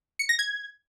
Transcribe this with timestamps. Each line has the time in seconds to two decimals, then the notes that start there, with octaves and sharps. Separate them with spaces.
0.19 C#7
0.29 A#6
0.39 G#6